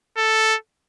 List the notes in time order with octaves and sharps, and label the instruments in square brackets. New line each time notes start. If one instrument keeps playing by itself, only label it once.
[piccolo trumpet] A4